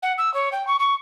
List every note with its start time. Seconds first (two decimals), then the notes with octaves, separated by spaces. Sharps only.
0.02 F#5
0.17 E6
0.33 C#5
0.52 G5
0.67 C#6
0.79 C#6